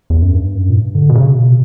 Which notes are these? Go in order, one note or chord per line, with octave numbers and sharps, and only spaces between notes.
E2
F#2
G2
F#2
A#2
G2
D3
B2
C#3
B2